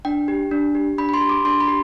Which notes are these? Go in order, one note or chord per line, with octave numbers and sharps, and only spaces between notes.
D4 G5
G4
D4
G4
D4 B5
B5
C6
G4
D6
D4 C6
B5
G4